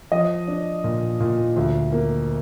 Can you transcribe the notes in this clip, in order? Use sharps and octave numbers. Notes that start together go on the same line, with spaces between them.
F3 D#5
D4
A#2
A#2
D2
A#3